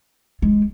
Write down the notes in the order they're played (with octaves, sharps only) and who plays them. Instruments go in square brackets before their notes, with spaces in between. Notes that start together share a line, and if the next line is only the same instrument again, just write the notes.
[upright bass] G#3